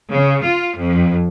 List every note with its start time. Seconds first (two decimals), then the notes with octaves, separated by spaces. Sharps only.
0.11 C#3
0.44 F4
0.77 F2